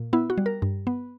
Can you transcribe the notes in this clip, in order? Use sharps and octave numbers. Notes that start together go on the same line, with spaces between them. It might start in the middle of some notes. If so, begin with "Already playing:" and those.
Already playing: A#2
B3 E4
F#4
G3
A#4
G2
B3